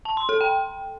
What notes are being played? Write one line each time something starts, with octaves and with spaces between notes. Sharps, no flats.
A5
C6
A4
G5